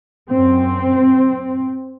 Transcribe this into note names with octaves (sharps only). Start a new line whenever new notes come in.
F#2 C4